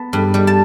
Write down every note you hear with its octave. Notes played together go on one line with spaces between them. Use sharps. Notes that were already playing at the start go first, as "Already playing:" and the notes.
Already playing: B3 A5
G2
G3
A5